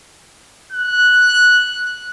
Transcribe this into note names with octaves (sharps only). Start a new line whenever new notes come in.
F#6